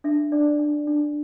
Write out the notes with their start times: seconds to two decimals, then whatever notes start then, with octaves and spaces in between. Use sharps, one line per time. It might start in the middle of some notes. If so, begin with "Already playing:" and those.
0.04 D4 E5
0.32 D4 D5
0.59 D4
0.87 D4